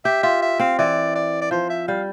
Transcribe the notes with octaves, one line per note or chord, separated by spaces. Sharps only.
G4 E5
F4 E5
E5
C4 F5
E3 D5
D5
D5
F3 C5
E5
G3 F5